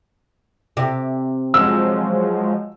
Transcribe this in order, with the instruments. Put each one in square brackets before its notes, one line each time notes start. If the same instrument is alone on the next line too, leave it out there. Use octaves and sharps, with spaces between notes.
[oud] C3 G4
[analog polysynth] F3 F#3 G#3 [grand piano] E6